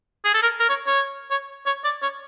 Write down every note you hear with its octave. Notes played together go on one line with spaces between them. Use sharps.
G#4
A4
A#4
A#4
C#5
C#5
C#5
C#5
D5
C#5